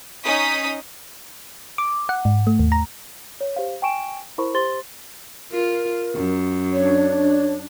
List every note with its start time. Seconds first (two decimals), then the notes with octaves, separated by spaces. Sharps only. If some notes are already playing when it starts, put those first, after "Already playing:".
0.24 C#4 D#4 D#6 B6
1.78 D6
2.09 F#5
2.25 G#2
2.47 A3
2.59 D#2
2.72 A#5
3.41 C#5
3.56 G4 C5 F5
3.82 G5 G#5 C#6 D7 E7
4.38 E4 A#4 C5 B5 C#6
4.54 G4 C5 C6 A6 G7
5.52 F4 A#4
6.15 F#2
6.73 D4 C#5